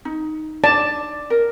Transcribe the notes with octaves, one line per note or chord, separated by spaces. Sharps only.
D#4
D5 A5
A#4